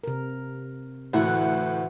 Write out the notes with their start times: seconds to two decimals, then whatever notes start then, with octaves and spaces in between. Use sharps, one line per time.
0.04 C3 A#4
1.13 D2 A2 E3 F#5